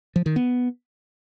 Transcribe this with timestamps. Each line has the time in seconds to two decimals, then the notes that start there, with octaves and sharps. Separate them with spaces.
0.16 F3
0.26 D#3
0.36 B3